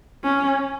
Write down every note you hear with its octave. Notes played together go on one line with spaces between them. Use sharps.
C#4